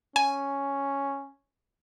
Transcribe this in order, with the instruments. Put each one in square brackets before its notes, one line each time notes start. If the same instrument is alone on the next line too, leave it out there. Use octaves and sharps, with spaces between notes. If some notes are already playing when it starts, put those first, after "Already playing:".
[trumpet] C#4 [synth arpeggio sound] G#5